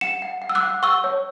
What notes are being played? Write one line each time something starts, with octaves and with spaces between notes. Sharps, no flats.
F#5 C#7 E7
F#5
F#5
E6
D6 F#6
F#5
F#5 C#6 E6
C#5